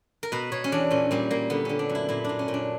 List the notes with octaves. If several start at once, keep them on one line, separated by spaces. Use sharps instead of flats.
A#4
B2 B4
B2 C#5
C#4
E2 D4
A#2 C#4
A#2 G3
A#2 A#3
D3 B3
D3 C#4
D4
F#2
E4
A#2 E4
A#2 D4
C#4
A#2
D4